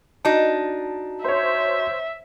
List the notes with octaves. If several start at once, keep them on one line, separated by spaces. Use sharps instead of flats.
D4 D#4 F#4 A5
C5 C#5 E5